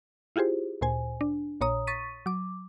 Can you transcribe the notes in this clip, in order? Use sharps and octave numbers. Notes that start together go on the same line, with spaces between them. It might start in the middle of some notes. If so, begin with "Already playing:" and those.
E4 F4 G4 G#4 C5
D2 A#2 C5 G#5
D4
A#1 A#2 C#5 A#5 D#6
C#6 A6 B6 D#7
F#3 D6